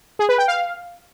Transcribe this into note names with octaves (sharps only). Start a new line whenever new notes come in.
G#4
B4
G5
F5